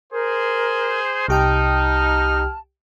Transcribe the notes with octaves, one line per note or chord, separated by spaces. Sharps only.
G#4 A#4 C5
C2 D#4 G4 G5 A5 F6